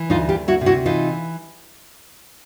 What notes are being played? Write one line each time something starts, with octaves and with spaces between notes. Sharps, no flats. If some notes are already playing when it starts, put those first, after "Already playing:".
Already playing: E3
D2 D#4 F4
F4 G4
D2
E4 F#4
C3
E4 F#4
E3 D#4 F4